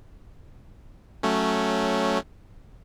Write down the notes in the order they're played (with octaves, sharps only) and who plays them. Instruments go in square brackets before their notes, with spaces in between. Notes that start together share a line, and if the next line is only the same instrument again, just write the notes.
[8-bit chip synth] F#3 A3 C#4